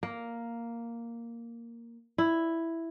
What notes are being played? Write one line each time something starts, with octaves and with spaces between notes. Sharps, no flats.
A#3
E4